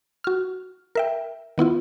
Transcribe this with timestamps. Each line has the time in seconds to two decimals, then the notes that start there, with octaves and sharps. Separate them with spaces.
0.24 F#4 F6
0.95 A#4 E5 G5
1.58 D#3 B3 E4 F4